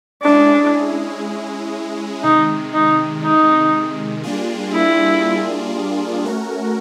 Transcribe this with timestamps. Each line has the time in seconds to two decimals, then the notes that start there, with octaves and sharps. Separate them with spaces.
0.23 G#3 C#4 D4 E4 G#4
2.23 C3 D#3 G#3 D#4
2.74 D#4
3.23 D#4
4.23 G3 A#3 D4 F4 G#4
4.73 E4
6.24 A3 C#4 F#4 A#4